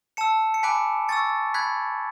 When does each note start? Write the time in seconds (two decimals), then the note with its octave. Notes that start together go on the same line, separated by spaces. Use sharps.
0.17 A5 E6 C#7 E7
0.54 C#7
0.63 G#5 B5 D6 F#6 B6 D7
1.09 G#5 C#6 E6 A6 C#7
1.54 B5 F#6 G#6 B6